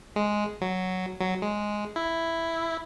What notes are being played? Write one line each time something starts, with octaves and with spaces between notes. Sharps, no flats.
G#3
F#3
F#3
G#3
E4